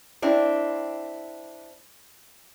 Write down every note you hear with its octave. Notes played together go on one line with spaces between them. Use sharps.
C4 D4 E4